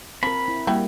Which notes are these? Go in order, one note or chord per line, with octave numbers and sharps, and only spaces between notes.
F3 C4 A#4 B5
E4
G3 A#3 E4 F#4 G5